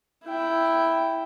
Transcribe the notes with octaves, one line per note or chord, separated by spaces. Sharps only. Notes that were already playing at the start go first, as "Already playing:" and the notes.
E4 G5